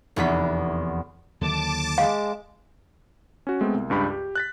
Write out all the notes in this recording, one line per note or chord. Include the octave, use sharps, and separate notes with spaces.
F1 E2 B3 B6
D#2 D3 F#3 A5 D6
G#3 F5
C#4 F#4
G#3 A3 B3 C4
C2
C#2 G2 G4 B5
G4
F#6 A6 B6